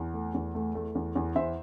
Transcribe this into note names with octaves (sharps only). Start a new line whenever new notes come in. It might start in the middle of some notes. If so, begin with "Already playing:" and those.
Already playing: E2
A3
E2
A3
A3
E2
E2
E2 C5 E5